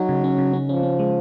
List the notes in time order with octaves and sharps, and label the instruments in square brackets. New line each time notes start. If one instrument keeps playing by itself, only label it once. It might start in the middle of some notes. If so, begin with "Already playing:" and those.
Already playing: [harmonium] F#3 [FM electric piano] D#4
[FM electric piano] C#3
C#4
C#3
C#4
[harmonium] F3 [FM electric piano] C#4
[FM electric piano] C#4
G#3